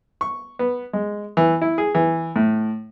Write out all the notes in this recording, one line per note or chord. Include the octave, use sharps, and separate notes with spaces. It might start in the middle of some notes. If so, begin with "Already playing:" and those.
C#6
B3
G#3
E3
E4
G#4
E3
A2